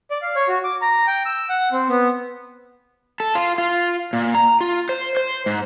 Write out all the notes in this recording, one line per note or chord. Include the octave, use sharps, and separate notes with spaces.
D5
F5
C#5
F#4
D6
A#5
G5
E6
F#5
C4
B3
A4
F4
F4
A#2
A#5
F4
C5
C5
G#2